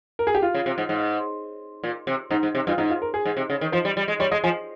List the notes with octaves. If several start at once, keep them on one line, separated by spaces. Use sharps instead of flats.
A#4
G#4
G4
F4
C#3
C3
G#2
G#2
A#2
C3
G#2 D#4
G#2
C3
G2 F4
G#2 D#4
F4
A#4
G#4
G#2
C3
C#3
D#3
F3 C5
G3
G3
G#3
G3 C#5
G#3 D#5
F3 G#5